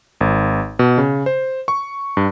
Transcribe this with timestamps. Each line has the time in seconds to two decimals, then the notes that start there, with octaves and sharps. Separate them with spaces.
0.21 G#1
0.79 B2
0.98 C#3
1.26 C5
1.68 C#6
2.17 G2